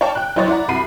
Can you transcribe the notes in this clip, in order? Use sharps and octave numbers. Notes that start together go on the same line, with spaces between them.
C#5 D5 F5 G5 A5
G5 F#6
F#3 E4 C5 C#5 D#5 A6
E4 D5 F#5 A#5
C2 F#4 B5 C7 D#7